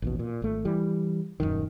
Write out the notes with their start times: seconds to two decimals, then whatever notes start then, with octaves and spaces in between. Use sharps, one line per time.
0.02 A1 D#2 B2
0.19 A#2
0.42 G#1 A3
0.65 E3 G3
1.40 D#1 A#1 F#2 D#3